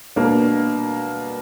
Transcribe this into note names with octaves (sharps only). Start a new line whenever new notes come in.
B2 A#3 D4